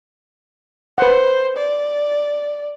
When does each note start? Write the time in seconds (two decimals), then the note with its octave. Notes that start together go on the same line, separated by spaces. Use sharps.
0.98 B4 C5 F#5
1.57 D5